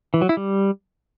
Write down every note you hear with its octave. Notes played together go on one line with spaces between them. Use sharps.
E3
F#3
E4
G3